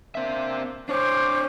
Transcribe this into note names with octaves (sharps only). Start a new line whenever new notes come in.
A#3 C4 D4 C5 E5
D4 C5 C#5 D6